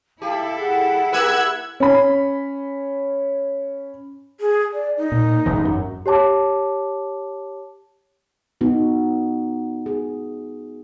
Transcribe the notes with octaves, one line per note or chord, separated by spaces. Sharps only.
E4 G4 A4 F5 A5
G#4 F#5
A#3 G4 B4 E6 F#6 G#6
C#4 B5
G#4
D5
D#4
A#2
F#1 G#2 E3
F#2
G4 C#5 A5 D6
B3 D#4 F#4
G#4